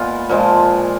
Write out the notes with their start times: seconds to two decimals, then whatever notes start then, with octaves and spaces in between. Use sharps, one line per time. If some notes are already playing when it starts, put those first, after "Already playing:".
Already playing: A#2 G#3 B3 F4
0.29 A#2 F3 G#3